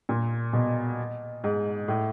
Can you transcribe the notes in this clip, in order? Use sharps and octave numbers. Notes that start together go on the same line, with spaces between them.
A#2
B2
G#2
A2